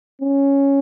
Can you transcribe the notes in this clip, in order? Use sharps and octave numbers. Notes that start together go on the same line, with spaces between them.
C#4